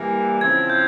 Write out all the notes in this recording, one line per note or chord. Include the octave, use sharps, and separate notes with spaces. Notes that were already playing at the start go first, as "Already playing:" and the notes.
Already playing: E3 G3 A#3
C#3 F3 C4 E4 G#6
G6